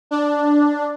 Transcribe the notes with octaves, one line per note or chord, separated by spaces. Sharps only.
D4